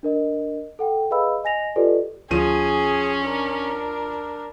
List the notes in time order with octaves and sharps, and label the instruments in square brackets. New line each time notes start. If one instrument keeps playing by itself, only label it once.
[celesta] D4 A#4 D#5
A4 F#5 G5
G#4 B4 D#5 F5 B5 E6
D#5 G#5 A#6 F7
F4 G4 A4 B4 D5 D#5
[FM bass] D2 [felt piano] F3 D#7 [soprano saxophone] C#4 [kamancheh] G#4
[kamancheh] D4 A#4